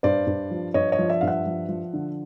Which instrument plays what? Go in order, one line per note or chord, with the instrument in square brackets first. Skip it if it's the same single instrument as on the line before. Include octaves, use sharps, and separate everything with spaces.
[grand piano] G2 C5 D5
G2
F3
G2 C#5 D#5
C#5 D#5
F3
D5 E5
G2 F5
E5 F#5
F3
F3
D3